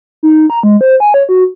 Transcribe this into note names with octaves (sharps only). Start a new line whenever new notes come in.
D#4
A#5
G#3
C5
G#5
C#5
F#4